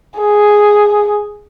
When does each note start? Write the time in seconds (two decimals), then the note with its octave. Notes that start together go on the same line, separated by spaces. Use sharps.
0.19 G#4